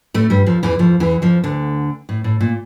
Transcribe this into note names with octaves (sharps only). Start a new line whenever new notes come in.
A2 A3
G2 G3
F2 F3
E2 E3
F2 F3
E2 E3
F2 F3
D2 D3
A2
A2
A#2